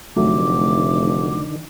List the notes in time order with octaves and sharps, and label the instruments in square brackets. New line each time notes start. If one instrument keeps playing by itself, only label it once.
[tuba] F1 [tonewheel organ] D3 D#3 [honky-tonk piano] F#3 A3 [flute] D6